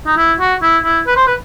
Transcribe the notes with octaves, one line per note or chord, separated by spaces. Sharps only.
D#4
E4
F#4
E4
E4
B4
C5
B4